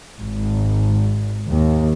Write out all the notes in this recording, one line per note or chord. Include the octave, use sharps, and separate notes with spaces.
G#1
D#2